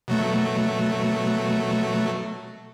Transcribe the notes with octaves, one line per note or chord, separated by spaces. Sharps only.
B2 F#3 A3